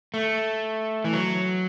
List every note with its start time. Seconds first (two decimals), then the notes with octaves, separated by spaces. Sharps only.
0.14 A3
1.04 E3
1.13 F#3